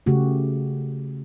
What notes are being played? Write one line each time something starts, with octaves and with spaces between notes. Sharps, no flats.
C#3 A3 F#4 G4